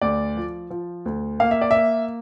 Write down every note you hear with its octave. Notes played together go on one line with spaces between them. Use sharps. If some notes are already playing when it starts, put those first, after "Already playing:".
D2 D5
F3
F3
D2
A#3 F5
E5
D5
A#3 E5